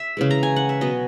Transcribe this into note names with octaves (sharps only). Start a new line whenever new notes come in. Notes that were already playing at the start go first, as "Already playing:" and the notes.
Already playing: E5
C#3 E3 G#3
A#5
G#5
F#5
E5
B2 F#3 B3 D#5